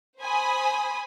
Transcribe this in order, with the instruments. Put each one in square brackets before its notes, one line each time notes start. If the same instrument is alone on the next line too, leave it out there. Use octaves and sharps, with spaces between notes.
[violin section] C5 G#5 B5 D#6